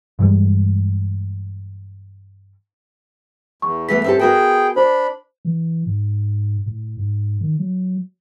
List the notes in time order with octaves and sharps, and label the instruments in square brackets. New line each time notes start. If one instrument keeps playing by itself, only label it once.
[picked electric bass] G2 E3 G3 G#3
[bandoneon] E2 [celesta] C#6
[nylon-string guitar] E3 A3 B3 [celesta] B6
[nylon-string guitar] C4 G4 A4
[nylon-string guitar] B3 F#4 A#4 [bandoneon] G#4 G5
[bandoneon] D4 B5 [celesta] C5
[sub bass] E3
G#2
A2
G#2
D#3
F#3